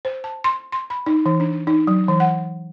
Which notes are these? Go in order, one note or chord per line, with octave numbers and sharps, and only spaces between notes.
C5
A5
C6
C6
B5
D#4
E3
D4
D#4
F#3
E3
F#5